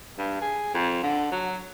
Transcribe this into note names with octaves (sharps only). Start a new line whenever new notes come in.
G2
G#4
F2
D3
F#3